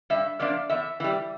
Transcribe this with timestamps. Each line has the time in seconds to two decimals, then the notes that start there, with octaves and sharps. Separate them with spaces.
0.10 G2 E5
0.40 F3 A#3 D4 D5
0.70 E2 E5
1.00 E3 G3